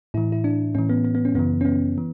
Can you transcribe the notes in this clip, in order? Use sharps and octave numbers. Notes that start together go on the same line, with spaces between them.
A2 E3 E4
E4
D4
A2 E3 C#4
B3
B3
B3
C#4
F#2 C#3 E3 B3
C#4
B3
E3